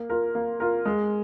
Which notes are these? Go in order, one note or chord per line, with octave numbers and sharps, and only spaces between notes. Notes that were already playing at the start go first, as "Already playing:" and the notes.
Already playing: A#3
F4 A#4
A#3
F4 A#4
G#3